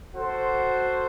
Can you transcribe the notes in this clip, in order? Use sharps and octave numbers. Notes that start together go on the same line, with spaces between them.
F#4 A4 C5